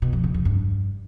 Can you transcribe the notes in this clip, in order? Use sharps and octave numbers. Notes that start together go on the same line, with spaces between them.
B2
F2
C#3
F2
G2